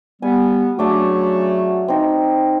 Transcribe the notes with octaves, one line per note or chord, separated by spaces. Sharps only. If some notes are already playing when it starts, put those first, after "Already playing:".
G3 B3 G#5
C#3 F#3 A3 D4 F#4 D6
C4 D#4